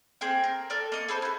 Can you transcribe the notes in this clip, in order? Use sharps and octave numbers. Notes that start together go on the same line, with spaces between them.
A#3 C4 G#4 G5
A#4
A4 A#4 D5
A#3 D#5 C#6
G#4 A4 B4 C5
E4 F#4